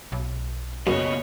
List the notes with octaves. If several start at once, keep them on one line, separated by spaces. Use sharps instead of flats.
B1
F#2 A#2 C#3 B3 C#5 D#5